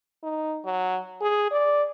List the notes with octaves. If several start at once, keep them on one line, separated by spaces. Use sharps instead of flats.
D#4
F#3
G#4
D5